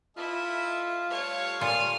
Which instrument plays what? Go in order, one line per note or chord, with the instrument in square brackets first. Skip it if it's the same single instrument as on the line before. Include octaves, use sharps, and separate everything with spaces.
[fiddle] E4 [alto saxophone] F4 [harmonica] A4 D#5 E5
[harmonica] G3 A3 F5 [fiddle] C#5
[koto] A#2 F4 A4 [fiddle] D#6 F6